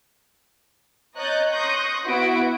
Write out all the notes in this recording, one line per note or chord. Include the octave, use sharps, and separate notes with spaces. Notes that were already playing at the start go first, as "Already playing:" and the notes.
C#5 D#5 A#5 F#6 G6 A6
C6 C#6 D#6 F#6 G6 A#6
B3 E4 F#4 F#5 D7